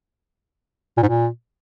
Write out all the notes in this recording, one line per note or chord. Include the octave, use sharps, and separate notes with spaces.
A#2
G#2
A#2